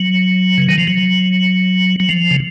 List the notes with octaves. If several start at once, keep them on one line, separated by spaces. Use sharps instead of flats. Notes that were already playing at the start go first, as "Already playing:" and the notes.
Already playing: F#3
C#3
D#3
F3
F#3
F#3
F3
C#3